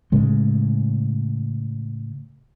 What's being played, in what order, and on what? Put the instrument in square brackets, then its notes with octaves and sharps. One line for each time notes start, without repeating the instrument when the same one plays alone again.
[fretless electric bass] A2 C#3 G#3